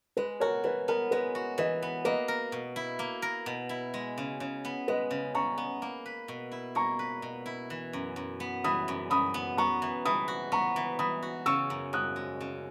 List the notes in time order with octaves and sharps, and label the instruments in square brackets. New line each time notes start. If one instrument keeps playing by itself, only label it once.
[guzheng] G#3 [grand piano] B4
[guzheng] F#4 [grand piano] A#4 C#5
[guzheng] E3 [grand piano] B4
[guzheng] B3 [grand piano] A#4
[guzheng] G#3 [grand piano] B4
[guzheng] F#4
[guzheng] E3 [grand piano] B4 D#5
[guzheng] B3
[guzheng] A#3 [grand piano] B4 D#5
[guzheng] A#4
B2
E4
A#3
A#4
B2
E4
G#3
C#3
C#3
B3
[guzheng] G#3 [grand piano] B4 D#5
[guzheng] C#3
[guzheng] C#3 [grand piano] A#5 C#6
[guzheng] B3
A#3
B4
B2
E4
[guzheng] A#3 [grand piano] A#5 C#6
[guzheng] B4
B2
E4
E3
F#2
F#2
B3
[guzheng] E3 [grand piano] B5 D#6
[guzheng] F#2
[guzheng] F#2 [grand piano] B5 D#6
[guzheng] B3
[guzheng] B3 [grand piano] A#5 C#6
[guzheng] E3
[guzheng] E3 [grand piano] B5 D#6
[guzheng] F#4
[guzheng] B3 [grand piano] A#5 C#6
[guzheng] E3
[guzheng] E3 [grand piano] B5 D#6
[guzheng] F#4
[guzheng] C#3 [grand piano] C#6 E6
[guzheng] F#2
[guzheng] F#2 [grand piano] D#6 F#6
[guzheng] G#3
C#3